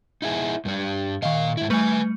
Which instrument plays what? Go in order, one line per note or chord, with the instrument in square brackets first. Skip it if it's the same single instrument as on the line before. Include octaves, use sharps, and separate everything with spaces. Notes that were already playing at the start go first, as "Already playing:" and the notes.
[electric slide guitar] D#4 E4 G#4
G2 G3 D4
[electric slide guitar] A#2 F5 [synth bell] D#3 D#5
[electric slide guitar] G#2 E4
[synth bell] G3 A3 C#7 [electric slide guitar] B4 G#5